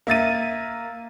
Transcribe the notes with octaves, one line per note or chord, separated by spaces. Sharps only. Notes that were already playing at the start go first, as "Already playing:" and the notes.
A#3 E5 A6 D#7